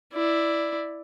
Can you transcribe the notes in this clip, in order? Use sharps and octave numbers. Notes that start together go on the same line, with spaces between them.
E4 D5